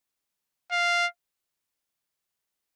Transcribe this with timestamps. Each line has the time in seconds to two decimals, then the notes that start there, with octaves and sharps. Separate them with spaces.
0.72 F5